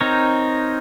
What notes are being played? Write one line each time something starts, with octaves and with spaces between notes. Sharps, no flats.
C4 D#4 A#4 C#5